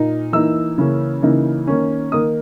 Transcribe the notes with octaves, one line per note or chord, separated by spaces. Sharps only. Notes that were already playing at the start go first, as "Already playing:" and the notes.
Already playing: A#2 A#3 D#4
E3 A#3 D#4 E6
C#3 E3 A#3 C#4
C#3 E3 A#3 D#4
D#3 A#3 C#4
D#3 A#3 D#4 D#6